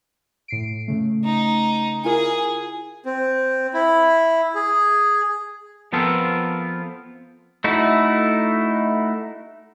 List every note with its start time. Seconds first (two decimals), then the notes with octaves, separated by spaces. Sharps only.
0.48 A2 C7 D7
0.88 C#3 A3
1.25 D#4
2.04 E4 F4 G#4 A#4
3.05 C4
3.74 E4
4.55 G#4
5.93 F3 B3 C4 F4 A4 A#4
7.64 A3 D#4 E4 F#4